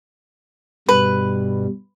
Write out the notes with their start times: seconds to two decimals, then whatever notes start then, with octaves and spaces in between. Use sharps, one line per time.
0.89 G2 B2 G3 B4